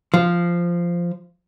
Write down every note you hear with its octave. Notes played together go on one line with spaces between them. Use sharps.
F3